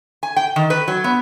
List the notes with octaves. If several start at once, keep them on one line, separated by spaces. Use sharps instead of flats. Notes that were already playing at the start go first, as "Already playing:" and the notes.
G#5
G5
D#3
B4
F#3
B3